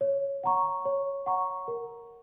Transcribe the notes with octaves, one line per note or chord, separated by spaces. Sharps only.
C#5
F#5 A#5 C#6
C#5
F#5 A#5 C#6
A#4